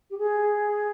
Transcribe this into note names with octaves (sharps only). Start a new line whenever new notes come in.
G4
G#4